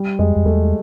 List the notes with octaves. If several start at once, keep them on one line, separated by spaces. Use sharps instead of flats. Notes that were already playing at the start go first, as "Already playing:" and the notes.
Already playing: G3
F2 G#3
F2
E2 A3